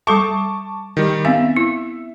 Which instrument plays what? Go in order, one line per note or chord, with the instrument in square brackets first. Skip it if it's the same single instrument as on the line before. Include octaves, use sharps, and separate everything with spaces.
[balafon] G3 A4 E5 [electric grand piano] A5 C#6 D6
[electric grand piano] D#3 G3
[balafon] B3 C4 F5 [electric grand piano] E5
[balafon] E4